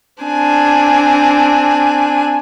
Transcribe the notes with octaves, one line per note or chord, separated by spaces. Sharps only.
C4 D4 G#5